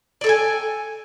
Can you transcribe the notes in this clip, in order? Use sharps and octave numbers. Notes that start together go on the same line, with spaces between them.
A4 D5 G5 G#5